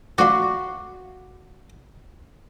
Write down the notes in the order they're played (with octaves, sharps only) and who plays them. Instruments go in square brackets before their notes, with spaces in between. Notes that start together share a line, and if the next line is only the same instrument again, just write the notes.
[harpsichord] A2 F3 D4 [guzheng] F#4 C6 [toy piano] F5 D6